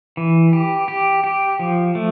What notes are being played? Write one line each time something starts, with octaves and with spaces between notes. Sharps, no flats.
E3
G4
G4
G4
F3
A3